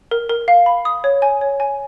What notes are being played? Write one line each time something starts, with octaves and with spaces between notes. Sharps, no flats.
A#4
A#4
F5
B5
D#6
C#5
G#5
C#5
G#5